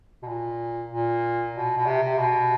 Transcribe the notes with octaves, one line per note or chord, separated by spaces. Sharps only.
B2
A#2
A#2
B2
B2
C3
C3
B2